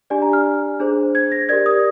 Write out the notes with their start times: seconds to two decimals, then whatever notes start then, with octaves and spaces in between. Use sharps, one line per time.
0.10 D4 G4 D5 G#5
0.22 A#5
0.33 F6
0.80 D4 G#4 C5
1.15 G#6
1.32 A#6
1.49 G4 A#4 D5 G#6
1.66 D#6